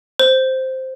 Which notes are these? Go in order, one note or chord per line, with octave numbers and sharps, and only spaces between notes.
C5